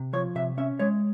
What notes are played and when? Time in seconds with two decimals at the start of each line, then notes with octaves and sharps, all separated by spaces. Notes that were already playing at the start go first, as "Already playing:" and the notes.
Already playing: C3
0.13 F3 C#5
0.35 C3 E5
0.58 C#4 E5
0.79 G#3 C#5